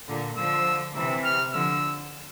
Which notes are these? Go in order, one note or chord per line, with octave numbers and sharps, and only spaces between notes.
A#2 D3
D3 F3 E6
C3 E3 E6
F6
D3 F3 E6